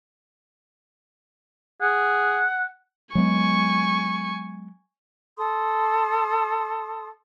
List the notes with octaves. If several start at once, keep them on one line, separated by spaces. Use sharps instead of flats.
G#4 F#5
F#3 G#3 B3 G#5 C#6
A4 C6 D#6